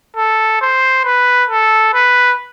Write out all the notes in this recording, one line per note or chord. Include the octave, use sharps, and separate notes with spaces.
A4
C5
B4
A4
B4